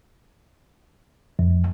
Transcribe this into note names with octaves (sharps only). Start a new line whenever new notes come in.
F2